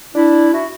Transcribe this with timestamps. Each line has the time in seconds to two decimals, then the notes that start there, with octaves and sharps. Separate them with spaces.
0.14 D4 E4
0.53 E4 F#4